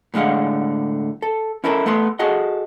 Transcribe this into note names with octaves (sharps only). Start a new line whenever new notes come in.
A2 D3 G#3 F5 F#5
A4
C#4 E4 A4 A#4 C#5 E5
A3 B3 A4 C6
F#4 G#4 A4 D#5 F#5